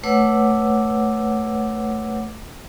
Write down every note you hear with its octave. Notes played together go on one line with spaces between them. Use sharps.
A3 B4 C#5 F#5 D6 E6